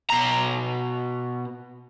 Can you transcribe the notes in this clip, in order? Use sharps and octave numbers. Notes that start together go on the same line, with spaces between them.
B2 A#5